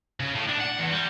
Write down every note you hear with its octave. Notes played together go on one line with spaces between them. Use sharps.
C#3
A2
D4
F#5
E2
G3